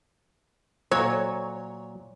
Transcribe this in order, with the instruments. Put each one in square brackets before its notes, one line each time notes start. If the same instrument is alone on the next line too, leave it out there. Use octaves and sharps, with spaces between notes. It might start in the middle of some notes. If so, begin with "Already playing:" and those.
[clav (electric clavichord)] A#2 F#3 [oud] C#5